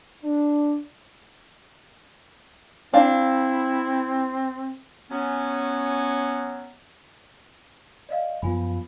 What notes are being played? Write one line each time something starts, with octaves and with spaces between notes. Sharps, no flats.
D4
C4 D4 E4 F5
F#3 B3 C#4
D5 D#5 F5
F#2 F3 B3 F4 G#5 B5